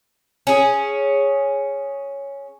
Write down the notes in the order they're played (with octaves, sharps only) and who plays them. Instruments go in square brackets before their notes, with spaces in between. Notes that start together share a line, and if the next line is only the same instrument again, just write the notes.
[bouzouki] C#4 G#4